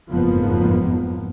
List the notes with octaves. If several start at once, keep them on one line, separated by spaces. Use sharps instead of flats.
F#1 F2 G#2 F3 A#3 B3